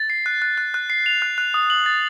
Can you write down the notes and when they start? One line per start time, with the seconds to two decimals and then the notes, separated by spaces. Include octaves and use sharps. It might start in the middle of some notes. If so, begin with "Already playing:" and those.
Already playing: A6
0.10 C7
0.26 F#6
0.42 F#6
0.58 F#6
0.74 F#6
0.90 C7
1.06 F7
1.22 F#6
1.38 F#6
1.54 D#6
1.70 F#7
1.86 A6